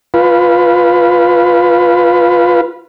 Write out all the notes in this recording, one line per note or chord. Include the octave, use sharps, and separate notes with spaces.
F4 B4